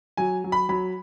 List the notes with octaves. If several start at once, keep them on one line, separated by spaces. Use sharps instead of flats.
F#3 G#5
F#3
B5
F#3 B5